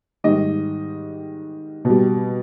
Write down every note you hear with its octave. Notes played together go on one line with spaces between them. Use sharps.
G#2 D#3 G3 D#5
B2 G3